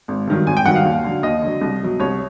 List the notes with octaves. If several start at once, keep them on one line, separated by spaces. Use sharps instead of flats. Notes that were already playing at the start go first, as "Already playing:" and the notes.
G#1
G2 D#3 F#3
G#1 G#5
G5
G2 D#3 F#3 F#5
F5
D#2
D3 F#3
D#2 D#5
D3 F#3
C2
B2 F#3
C2 C#5